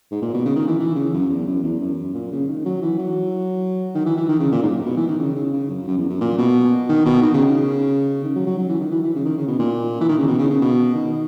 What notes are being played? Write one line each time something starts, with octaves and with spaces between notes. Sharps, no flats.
G#2
A#2
B2
C#3
D#3
E3
E3
C#3
F#2
E2
F#2
E2
F#2
A#2
C#3
D#3
F#3
E3
F#3
D#3
E3
E3
D#3
C#3
A#2
G#2
F#2
B2
E3
D#3
C#3
C#3
C#3
F#2
F#2
E2
F#2
A#2
B2
D#3
B2
D#3
C#3
C#3
D#3
F#3
F#3
F#3
E3
D#3
E3
E3
C#3
D#3
C#3
B2
A#2
E3
D#3
C#3
B2
C#3
C#3
B2
D#3